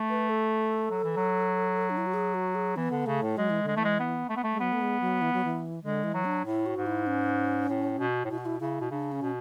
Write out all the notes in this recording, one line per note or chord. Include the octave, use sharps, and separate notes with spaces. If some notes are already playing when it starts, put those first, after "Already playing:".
Already playing: A3
B4
A4
F#3
E3
F#3
D4
E4
F#4
G#4
F#4
G#4
E3 B3
D3
C#3 A3
A2
F#3 G#3
E3
D3 G#3
E3 A3
G#3
B3
A3
B3
A3
G#3
F#3 B3
A3
G#3
F#3
E3
F#3
E3
D3 G#3
E3
F#3
D4
A2 E4
F#4
G#2
E4
C#4
A2
B2
A2
B2 E4
F#4
E4
C#3 E4
B2
C#3 D4
C#4
B2